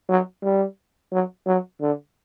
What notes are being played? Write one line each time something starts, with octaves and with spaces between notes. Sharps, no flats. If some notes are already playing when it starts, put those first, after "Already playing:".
F#3
G3
F#3
F#3
D3